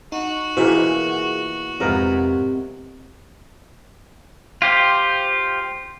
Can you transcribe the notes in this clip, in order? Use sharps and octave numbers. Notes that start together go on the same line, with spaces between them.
D#4 F#4
B2 E3 A#3 F4 G#4
F2 G#2 C3 B3 F4 A#4 D#5
F4 G4 C5